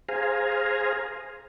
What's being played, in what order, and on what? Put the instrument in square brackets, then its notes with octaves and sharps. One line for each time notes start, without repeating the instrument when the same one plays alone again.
[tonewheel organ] G#4 C5 F5 G#5 A#5